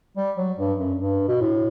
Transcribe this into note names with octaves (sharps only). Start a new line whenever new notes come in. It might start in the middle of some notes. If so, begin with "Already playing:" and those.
G3
F#3
G2
F#2
G2
B2
A2